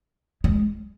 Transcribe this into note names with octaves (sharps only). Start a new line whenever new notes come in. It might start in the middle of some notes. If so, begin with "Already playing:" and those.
G#3